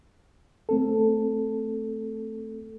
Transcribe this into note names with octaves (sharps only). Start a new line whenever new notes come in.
A3 C4 A4